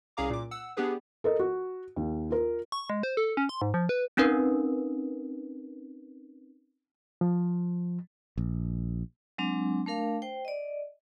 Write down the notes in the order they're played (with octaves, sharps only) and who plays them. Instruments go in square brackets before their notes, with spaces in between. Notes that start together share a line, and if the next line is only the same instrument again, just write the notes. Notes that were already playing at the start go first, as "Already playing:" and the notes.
[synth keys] C2 C#4 G#4 F5 A#5 D6
A#2 D6
F#5 E6
B3 D4 G4 G#4 B4
[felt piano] A4 A#4 D#5
F#4
D#2
F4 A#4
[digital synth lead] C#6
G#3
C5
A4
C#4
C6
G#2
F3
B4
[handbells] C4 C#4 D#4 A#4 B4
[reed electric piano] F3
[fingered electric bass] A#1
[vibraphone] F#3 G#3 C4 D4
A3 D4 A#4 F5
C5 G5
D5 D#5